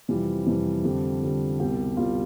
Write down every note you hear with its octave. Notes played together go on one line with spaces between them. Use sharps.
F2 C3 E3 G3 F4
F2 C3 E3 G3
F2 D3 G3
F2 D3 G3
C2 B2 G3 G4
C2 B2 G3 F4